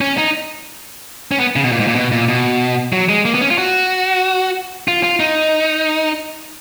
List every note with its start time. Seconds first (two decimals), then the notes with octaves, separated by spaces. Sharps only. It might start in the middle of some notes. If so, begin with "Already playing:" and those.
0.01 C#4
0.18 D#4
1.32 C#4
1.40 B3
1.56 C#3
1.64 B2
1.72 A#2
1.80 G#2
1.88 A#2
1.95 B2
2.12 A#2
2.28 B2
2.93 F#3
3.09 G#3
3.25 A#3
3.34 B3
3.41 C#4
3.50 F4
3.58 F#4
4.88 F4
5.03 F4
5.20 D#4